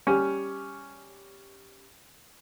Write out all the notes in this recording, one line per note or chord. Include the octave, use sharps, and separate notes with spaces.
G3 C#4